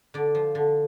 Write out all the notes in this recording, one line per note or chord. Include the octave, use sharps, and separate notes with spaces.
D3 D5
F3
D3